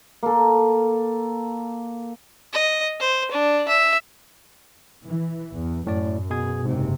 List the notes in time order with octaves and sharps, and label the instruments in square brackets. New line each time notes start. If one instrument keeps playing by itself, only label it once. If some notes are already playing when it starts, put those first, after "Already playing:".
[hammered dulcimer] A#3 A4
[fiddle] D#5
C5
D4
E5
[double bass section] E3
E2
[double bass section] F#2 [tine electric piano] A2 D5
[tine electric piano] B2 G#4 G#6
[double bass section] F#1 C3 [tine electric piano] G#2